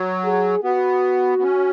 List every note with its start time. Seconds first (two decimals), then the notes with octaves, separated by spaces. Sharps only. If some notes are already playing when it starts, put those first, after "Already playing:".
Already playing: F#3
0.25 G#4
0.64 B3 F#4
1.38 B3
1.43 C#4